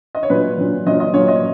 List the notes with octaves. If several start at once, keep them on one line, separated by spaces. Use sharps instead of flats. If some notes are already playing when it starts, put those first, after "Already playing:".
D#5
C#5
A#2 F#3 B4
A#2 F#3
A#2 F#3 D#5
D#5
A#2 C#5
F#3
D#5